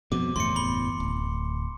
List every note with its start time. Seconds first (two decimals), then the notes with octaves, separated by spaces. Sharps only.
0.12 F2 B2 D6
0.36 F#1 E2 A2 C6 C#7
0.56 B5 G7
1.00 D1